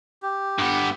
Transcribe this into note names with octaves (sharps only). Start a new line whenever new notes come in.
G4
G2 B3